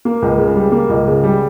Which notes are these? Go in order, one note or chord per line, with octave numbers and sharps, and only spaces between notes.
A#3
C#2
C#3
G3
A#3
C#2
C#3
G3